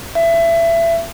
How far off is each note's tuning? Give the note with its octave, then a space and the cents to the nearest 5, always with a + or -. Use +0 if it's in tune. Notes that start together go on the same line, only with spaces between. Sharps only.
E5 +25